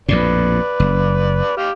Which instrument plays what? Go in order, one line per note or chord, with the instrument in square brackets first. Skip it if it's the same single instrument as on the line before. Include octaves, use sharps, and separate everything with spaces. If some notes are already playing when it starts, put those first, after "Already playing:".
[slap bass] A#1 F2 A2 [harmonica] B4 D5
[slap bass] F#1
[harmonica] G4 F5